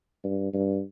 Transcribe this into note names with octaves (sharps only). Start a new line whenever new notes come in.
G2
G2